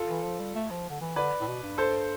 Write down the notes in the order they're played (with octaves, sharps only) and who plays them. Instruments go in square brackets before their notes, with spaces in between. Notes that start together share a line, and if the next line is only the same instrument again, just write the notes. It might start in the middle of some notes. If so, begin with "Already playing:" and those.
Already playing: [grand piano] F4 A4
[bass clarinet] E3
F3
G3
A3
F3
D3
E3
[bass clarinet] D3 [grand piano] B4 D5
[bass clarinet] A2
B2
G2
[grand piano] A4 C5